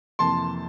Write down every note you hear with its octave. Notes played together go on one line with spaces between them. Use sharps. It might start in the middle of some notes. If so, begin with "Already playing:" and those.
F2 C3 E3 A#3 A5 C6